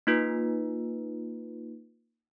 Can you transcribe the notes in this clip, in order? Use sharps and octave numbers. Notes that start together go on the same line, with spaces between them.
A#3 D#4 F4 B4